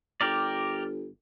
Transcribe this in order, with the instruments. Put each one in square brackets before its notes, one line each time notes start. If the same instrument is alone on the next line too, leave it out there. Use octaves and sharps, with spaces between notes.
[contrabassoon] G1 [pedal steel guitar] G4 A#4 D5